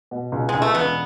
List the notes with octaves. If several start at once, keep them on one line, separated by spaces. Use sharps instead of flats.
B2
C#2
C#2 G#3
A3
E1 B3